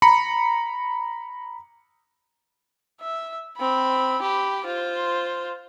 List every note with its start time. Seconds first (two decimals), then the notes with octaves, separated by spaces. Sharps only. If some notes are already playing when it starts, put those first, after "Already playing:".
0.02 A#5 B5 C#7
3.01 E5
3.57 C4 B5
4.22 G4 B5
4.65 F4 C5